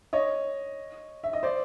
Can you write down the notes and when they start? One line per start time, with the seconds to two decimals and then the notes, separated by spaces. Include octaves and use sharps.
0.13 C#5 D#5
1.24 E5
1.33 D#5
1.43 C5 D5